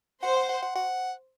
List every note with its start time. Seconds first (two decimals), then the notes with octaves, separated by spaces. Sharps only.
0.23 C5 F#5
0.37 F#5
0.49 F#5
0.62 F#5
0.75 F#5